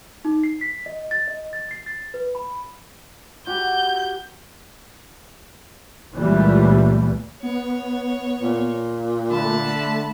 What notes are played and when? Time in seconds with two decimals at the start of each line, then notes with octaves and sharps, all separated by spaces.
0.25 D#4
0.44 C7
0.61 B6
0.86 D#5
1.11 A6
1.28 D#5
1.53 A6
1.71 C7
1.86 A6
2.14 B4
2.35 B5
3.47 F#4 G4 G6
6.14 C#2 A#2 E3 G3 A3
7.43 B3 C#5
8.42 A#2
9.31 D3 A3 A5 B5